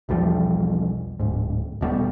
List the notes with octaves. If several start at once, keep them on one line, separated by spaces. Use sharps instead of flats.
B1 E2 F3 G3
D1 G#2
D#1 B2 G3